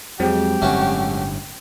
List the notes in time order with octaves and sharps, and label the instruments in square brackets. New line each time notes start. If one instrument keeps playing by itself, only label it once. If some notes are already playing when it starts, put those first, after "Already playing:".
[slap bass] F2 [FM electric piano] F#3 G#3 C4 [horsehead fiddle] G4
[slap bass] G1 A2 [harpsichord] A3 C#4 F#4